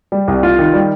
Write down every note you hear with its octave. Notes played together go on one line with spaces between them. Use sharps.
G3
C2
F4
D#3
G3